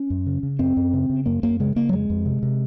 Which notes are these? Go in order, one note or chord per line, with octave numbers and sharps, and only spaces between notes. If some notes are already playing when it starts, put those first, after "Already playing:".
Already playing: C#4
F#2
C#3
C#3
F#2 C4
F#2
C#3
C#3
F#2 A#3
F#2 A#3
C#3 G#3
C#3 A#3
F#3
F2 G#3
F2
C3
C3